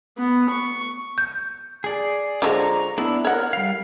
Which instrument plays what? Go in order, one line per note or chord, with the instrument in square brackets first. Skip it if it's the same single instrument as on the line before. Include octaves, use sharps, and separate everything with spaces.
[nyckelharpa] B3
C#6
[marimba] G6
[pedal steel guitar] G#4 D5
[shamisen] D3 F3 G#3 [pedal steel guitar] A#5 C#6 D6
[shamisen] B3 [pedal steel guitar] D4 E4
[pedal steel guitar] A#4 [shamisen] C#5 F#5
[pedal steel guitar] G3 F5